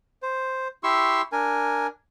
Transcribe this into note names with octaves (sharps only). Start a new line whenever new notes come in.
C5
E4 G4 C6 C#6 E6
D4 A#4 G#5